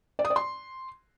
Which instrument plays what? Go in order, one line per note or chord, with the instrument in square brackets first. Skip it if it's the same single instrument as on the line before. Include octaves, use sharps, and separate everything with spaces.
[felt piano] D5
D#6
D5
C6